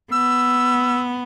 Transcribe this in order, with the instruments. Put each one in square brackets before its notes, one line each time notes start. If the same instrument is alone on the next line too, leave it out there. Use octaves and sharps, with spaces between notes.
[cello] B3 [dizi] E6